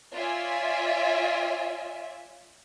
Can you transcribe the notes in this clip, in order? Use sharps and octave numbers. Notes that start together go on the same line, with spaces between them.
F4 C#5 D5 E5 G#5